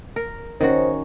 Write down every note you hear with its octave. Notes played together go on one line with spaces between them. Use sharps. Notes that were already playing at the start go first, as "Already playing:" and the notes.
A#4
D#3 C#4 D#4 F#4 C5